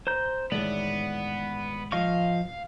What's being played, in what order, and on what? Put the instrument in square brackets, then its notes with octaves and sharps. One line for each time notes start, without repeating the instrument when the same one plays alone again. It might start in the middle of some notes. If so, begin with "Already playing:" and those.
[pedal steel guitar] C5 A#5 G6
[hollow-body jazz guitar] A2 D#3 E3 [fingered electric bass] G#3 [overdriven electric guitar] B3 [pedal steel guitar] D5
[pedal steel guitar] F3 D#5 C#6 [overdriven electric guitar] F5